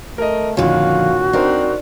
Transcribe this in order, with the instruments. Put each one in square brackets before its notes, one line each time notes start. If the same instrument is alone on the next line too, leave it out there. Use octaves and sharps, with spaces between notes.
[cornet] A3 [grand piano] A#4 D#5
[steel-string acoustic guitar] F2 D3 [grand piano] A#2 D#3 C#4 [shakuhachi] F#4 [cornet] F5
[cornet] C4 [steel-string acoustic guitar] D4 [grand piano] D#4 A#4 C5